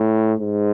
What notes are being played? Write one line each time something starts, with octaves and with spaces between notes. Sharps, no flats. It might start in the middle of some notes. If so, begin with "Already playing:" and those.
Already playing: A2
G#2